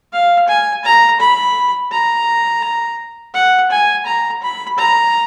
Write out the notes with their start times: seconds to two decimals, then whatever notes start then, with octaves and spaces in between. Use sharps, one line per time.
0.12 F5
0.48 G#5
0.84 A#5
1.20 B5
1.91 A#5
3.34 F#5
3.70 G#5
4.06 A#5
4.42 B5
4.77 A#5